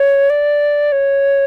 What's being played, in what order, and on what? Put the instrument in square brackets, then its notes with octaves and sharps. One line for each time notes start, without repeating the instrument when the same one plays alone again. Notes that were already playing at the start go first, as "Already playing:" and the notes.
Already playing: [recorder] C#5
D5
C#5